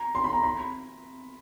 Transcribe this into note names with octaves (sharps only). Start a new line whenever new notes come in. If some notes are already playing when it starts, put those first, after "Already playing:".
Already playing: A#5
C6
B5
A#5
B5